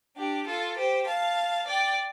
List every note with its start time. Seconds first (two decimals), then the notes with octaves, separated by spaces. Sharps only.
0.17 D4 G4
0.46 F4 A4
0.77 G4 C5
1.06 F5 A5
1.67 D5 G5